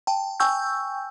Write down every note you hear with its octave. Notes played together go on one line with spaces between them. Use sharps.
G5 A5
G5 G#5 C#6 E6 G6